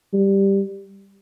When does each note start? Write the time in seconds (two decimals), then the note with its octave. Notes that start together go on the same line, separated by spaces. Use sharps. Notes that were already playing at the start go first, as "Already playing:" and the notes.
0.13 G3